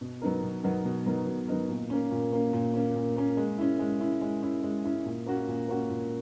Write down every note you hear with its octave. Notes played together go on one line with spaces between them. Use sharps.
B2
F#3 B3 D#4 A#4
B2
F#3 B3 D#4 A#4
B2
F#3 B3 D#4 A#4
B2
F#3 B3 D#4 A#4
A#2
A#3 C#4
A#2
A#3 C#4
A#2
A#3 C#4
A#2
A#3 C#4
G#3
C#4 E4
G#3
C#4 E4
G#3
C#4 E4
G#3
C#4 E4
A#2
A#3 C#4 F#4
A#2
A#3 C#4 F#4
A#2